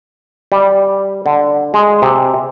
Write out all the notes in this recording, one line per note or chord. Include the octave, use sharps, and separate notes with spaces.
G3
D3
G#3
C3